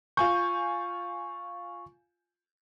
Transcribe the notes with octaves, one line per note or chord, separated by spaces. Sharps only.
F4 G#5 C#6 G6